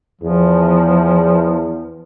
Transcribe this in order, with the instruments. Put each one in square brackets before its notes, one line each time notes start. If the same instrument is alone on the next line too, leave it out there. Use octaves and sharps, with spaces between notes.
[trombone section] E2 [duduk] F3